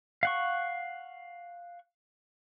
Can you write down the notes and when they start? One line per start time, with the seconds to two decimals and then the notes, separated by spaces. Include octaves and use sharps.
0.23 F5 F#5 C#6